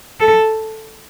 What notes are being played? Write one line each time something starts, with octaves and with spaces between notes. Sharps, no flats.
A4